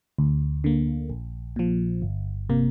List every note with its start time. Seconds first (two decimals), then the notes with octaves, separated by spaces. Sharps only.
0.18 D2
0.64 D3 A#3
1.10 A#1
1.56 A#2 F3
2.02 G1
2.49 C3 A#3